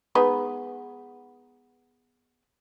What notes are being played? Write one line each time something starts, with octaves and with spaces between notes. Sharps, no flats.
G#3 B3 D#4